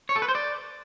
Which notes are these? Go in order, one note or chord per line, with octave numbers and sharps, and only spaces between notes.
C#5
A4
B4
C5
D5